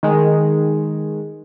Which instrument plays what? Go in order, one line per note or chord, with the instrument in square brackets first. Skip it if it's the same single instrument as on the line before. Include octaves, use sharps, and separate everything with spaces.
[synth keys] D#3 G#3